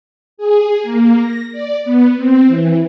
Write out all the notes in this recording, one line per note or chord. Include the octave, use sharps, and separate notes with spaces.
G#4
A#3
A#6
D5
B3
C4
E3